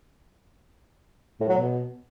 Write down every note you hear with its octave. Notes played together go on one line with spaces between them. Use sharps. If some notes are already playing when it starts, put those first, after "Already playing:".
A2
F#3
B2